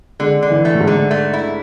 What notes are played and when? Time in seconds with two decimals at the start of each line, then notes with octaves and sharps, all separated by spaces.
0.19 D3 G#3
0.43 D3
0.50 E3
0.65 A3
0.74 A2
0.80 G#2
0.87 D3
1.11 A3
1.33 E4